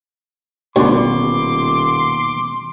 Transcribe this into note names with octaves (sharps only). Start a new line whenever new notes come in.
D#1 D2 B2 C6 D6